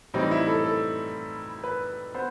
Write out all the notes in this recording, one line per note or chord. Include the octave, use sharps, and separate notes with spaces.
A2 E3 G3 C4 D#4
E4
A4
A4
B4
B3 C5